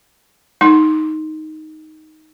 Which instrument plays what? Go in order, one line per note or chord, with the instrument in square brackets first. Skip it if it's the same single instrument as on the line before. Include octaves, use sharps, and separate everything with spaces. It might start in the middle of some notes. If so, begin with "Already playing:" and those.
[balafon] G#3 D#4 C6